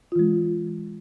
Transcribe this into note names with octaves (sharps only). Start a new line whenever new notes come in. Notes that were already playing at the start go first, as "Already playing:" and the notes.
E3 G#3 F4